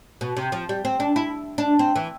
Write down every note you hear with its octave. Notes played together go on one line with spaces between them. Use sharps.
B2
C3
F3
G3
C4
D4
E4
D4
C4
E3